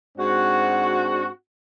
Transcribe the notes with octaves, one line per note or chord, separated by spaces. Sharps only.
G#2 C4 D4 F#4